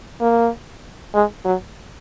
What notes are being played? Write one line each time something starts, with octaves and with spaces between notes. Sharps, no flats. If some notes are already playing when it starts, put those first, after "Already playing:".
A#3
G#3
F#3